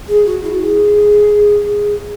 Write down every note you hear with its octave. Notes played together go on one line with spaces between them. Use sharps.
G#4
F#4
E4
G#4